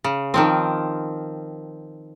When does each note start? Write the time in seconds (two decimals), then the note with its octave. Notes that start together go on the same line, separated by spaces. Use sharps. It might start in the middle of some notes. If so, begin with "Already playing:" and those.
0.04 C#3
0.34 D#3 F3 C4